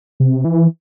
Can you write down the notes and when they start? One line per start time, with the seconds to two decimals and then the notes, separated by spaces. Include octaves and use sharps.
0.20 C3
0.45 E3